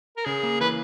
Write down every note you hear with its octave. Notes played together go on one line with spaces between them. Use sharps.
A#4
C#3 G#4
A#3
E3 B4